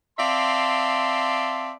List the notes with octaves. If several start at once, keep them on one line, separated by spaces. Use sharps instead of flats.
C4 D5 E5 F5 A5 C6